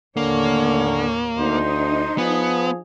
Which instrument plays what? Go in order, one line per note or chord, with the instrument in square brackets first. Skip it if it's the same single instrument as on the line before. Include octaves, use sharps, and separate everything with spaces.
[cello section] D#2 A2 C#5 [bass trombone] D3 [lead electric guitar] A#3 [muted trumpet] C#4
[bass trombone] D2 [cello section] D4 D#4 [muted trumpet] C5
[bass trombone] F3 [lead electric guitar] B3 [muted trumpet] G#4